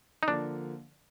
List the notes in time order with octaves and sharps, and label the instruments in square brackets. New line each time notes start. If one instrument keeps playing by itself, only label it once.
[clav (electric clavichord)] D#4
[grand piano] D3 F3 A#3 [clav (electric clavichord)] D4